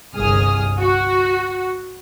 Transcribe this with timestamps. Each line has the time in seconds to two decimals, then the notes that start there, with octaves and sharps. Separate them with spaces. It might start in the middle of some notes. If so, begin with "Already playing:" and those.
0.15 G1 C2 G#4 D#6 F6
0.78 F#4